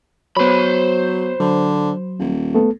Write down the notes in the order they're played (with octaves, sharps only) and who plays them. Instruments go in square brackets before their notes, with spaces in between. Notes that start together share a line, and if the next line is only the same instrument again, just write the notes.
[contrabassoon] F#3 [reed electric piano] B3 C#5 [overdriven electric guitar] C5 B5
[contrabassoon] D3 [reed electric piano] F#3
[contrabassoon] D#1
[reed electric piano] A3 B3 A4